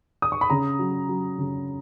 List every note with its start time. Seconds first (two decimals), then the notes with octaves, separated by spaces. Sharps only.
0.22 D#6
0.32 C#6
0.41 B5
0.50 C#3 A#5
0.79 F#3
1.09 F#3
1.38 C#3